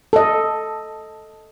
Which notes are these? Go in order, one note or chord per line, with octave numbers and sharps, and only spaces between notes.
A4 D#5